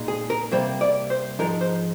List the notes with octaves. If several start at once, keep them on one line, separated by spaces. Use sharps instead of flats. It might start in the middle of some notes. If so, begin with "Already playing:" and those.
Already playing: A#2 G#3 D#4
G#4
A#4
C3 G3 A#3 C5
D5
C5
G#2 F3 G#3 D#4 A#4
C5